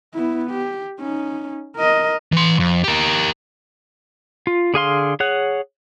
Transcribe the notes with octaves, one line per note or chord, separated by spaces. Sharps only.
B3 E4
G4
C#4 D#4
A#4 D#5
E3 C6
F2
G4 A#4
F4
D3 G#4 F5 C6
G#4 C#5 F#5 F#6